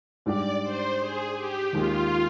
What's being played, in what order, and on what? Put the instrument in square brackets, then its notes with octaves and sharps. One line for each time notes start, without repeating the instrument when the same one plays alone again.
[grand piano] G#2 G3 D4 G4 [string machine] D5
[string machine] C5
G#4
G4
[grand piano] D#2 D#3 G#3 [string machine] F4